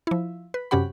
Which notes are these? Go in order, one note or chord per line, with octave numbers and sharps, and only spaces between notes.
F3 E4
B4
F#2 C3 C#4 G4 F#5 B5